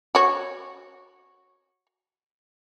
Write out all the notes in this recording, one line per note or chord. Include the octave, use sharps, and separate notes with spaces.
F#4 C#5